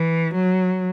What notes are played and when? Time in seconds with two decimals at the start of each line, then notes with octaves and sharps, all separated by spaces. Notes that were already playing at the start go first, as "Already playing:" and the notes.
Already playing: E3
0.34 F#3